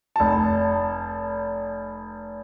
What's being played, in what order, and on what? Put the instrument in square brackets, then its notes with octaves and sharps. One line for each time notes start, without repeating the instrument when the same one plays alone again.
[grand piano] F1 A5